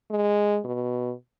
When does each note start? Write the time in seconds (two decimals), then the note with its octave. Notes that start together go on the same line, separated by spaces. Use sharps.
0.11 G#3
0.64 B2